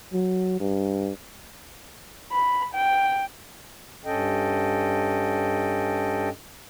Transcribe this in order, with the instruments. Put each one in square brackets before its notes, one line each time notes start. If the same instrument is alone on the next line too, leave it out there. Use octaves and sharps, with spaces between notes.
[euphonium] F#3
G2
[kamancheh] B5
G5
[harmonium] G2 C#4 A4 D#5 G5